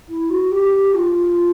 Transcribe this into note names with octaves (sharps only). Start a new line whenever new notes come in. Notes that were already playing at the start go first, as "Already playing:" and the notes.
E4
F#4
G4
F4